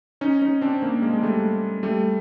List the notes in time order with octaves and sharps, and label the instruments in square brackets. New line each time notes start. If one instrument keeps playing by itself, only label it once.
[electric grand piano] C#4 D#4
C#4 D#4
C4 D4
A#3 C4
G#3 A#3
G#3
G3 A3
G3 A3